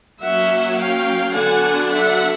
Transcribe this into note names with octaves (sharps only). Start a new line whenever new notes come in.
F#3 A#3 C#4 E5 F#5
F5 G5
D3 F#3 B3 D4 F#5 G#5
E5 F#5